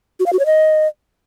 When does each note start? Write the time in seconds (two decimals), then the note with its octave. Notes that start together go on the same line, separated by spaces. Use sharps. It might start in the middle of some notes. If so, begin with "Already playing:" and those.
0.20 F#4
0.26 F5
0.33 F#4
0.39 C#5
0.46 D#5